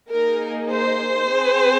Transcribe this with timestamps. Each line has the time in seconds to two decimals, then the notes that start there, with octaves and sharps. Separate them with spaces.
0.10 A#3 D#4 G#4 A#4
0.70 C5
1.29 C4 G#4